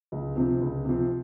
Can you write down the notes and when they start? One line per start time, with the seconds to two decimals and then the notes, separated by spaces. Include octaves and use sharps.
0.12 C#2
0.36 C3 F3 C4
0.61 C#2
0.85 C3 F3 C4